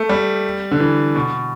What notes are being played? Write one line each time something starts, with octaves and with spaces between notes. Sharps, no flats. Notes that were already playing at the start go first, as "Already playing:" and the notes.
Already playing: A3
G3
D3
E3
B2